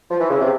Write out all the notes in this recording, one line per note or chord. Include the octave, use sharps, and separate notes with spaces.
F3
E3
C#3
C3